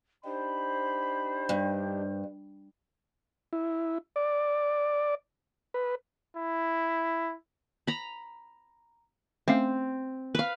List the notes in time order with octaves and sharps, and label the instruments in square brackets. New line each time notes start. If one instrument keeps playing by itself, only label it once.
[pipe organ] D4 D#4 G4 [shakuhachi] C5 [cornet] B5
[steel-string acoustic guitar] G2
[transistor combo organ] E4
D5
B4
[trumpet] E4
[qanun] A#5 B5
[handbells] A3 C#4 F5 [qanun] C4
[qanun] B4 F5